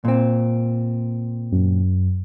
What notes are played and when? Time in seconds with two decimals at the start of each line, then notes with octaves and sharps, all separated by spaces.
0.05 A#2 C4
1.52 F#2